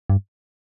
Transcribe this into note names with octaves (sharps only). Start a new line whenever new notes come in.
G2